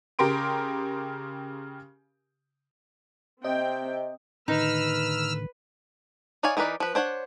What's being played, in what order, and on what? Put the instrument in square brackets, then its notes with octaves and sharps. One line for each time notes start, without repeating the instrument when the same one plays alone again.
[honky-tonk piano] C#3 G4 A#4 C6 D7
[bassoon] C3 [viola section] C4 G5 [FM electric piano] D#5
[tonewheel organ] A2 D3 D#3 [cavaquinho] D#4 [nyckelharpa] B4 [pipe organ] E6 F6
[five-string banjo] D#4 C#5 D5 F5 G#5
E3 D#4 A#4 B4 D5
F3 B4
D4 C5 C#5 F#5